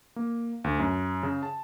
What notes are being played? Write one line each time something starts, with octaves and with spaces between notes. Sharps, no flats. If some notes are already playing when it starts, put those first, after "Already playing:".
A#3
D2
F#2
C#3
A5